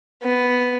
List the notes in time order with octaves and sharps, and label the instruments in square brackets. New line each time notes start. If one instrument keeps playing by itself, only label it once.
[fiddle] B3